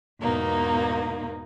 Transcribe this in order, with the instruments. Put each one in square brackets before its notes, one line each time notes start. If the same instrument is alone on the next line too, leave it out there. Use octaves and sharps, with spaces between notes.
[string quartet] E2 G#2 B2 A#3 D#4